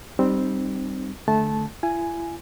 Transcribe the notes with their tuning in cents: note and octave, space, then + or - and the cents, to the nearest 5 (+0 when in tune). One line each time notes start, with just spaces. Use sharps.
G3 +0 C4 +0 D#4 -30
D3 -5 A3 -20 A5 -15
E4 +40 G#5 +0